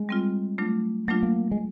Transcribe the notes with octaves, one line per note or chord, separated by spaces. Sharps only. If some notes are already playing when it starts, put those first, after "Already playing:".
Already playing: G#3
G3 C4 F4
F#3 A3 D4 F4
F#3 A3 A#3 D4 F4
A#3
G#3